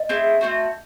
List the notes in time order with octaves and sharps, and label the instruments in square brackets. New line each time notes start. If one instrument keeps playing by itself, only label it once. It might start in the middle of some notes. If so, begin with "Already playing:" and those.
Already playing: [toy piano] D#5
[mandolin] A3 C4 E4 G#4
A3 C4 F#4